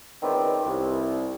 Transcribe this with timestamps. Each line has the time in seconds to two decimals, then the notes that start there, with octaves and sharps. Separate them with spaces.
0.22 C#2 D#3 B3 C4 D5
0.65 C2